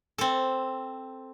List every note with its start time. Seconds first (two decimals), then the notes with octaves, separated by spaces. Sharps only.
0.18 C4 A4